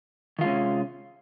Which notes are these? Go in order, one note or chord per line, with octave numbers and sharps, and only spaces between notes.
C3 D#3 G#3 C#4 F4